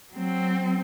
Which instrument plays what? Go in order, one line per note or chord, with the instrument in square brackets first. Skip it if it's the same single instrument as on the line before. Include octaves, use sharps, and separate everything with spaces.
[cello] F#3 C4